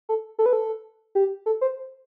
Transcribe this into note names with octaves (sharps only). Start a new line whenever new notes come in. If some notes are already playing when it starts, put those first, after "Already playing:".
A4
A4
B4
A4
G4
A4
C5